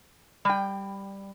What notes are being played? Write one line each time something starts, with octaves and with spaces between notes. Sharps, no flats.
G3 G5